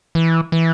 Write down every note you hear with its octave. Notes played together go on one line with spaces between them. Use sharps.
E3
E3